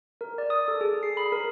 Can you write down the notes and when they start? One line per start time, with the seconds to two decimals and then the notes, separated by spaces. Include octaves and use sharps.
0.21 A#4
0.38 D5
0.50 D#6
0.68 A4
0.81 G#4
1.03 C7
1.17 B5
1.32 A#4